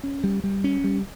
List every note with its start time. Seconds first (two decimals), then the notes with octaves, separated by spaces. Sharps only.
0.03 C#4
0.24 G3
0.44 G3
0.64 C#4
0.84 G3